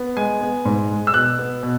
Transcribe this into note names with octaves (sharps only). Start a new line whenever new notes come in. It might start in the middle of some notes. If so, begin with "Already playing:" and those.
Already playing: B3
G#3 G#5
B3
G#2
G#3
E6
B2 F#6
B3
B2